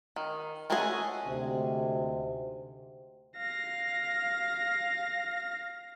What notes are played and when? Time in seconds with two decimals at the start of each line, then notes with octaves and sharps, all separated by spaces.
0.16 D#3
0.70 G#3 A3 C#4 F#4 G#4
1.26 D2 G#2 C3
3.38 F5 A#6